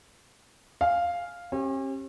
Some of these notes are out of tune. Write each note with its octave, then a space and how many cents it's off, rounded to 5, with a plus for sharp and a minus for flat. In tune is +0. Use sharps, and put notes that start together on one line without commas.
F5 +0 G#5 +0
C#4 -45 G4 +0